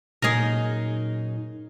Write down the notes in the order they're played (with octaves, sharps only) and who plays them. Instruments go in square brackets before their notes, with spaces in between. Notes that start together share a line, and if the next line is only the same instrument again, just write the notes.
[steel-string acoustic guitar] F#2 D#4 [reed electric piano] A#2 [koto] G#4 A#4